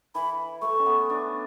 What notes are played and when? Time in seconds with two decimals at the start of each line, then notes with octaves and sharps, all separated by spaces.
0.15 E3 B5
0.62 A3 C#6
0.79 C#4
0.86 B3
1.10 D4